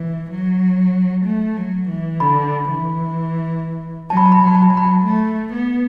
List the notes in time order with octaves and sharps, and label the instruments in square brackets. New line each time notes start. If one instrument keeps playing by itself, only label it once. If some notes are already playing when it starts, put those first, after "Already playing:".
Already playing: [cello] E3
F#3
A3
F#3
E3
[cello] D3 [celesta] B5
[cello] E3
[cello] F#3 [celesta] A5
[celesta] B5
A5
B5
[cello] F#3 [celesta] A5
[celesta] B5
A5
B5
A5
[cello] F#3 [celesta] B5
[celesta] A5
[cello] A3
B3